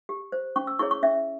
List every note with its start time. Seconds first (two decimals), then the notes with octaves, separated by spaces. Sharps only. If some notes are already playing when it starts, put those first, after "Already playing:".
0.09 G4
0.32 C5
0.56 C#4 C#6
0.67 E6
0.79 E4 G#4 C#5 C#6
0.91 C#6
1.03 C#4 E5